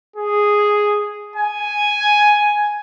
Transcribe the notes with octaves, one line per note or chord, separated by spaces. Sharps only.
G#4
G#5